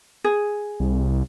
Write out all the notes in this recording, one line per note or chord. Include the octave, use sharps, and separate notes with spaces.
G#4
C2